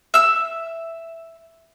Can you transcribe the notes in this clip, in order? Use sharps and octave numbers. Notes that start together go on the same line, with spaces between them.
E5 E6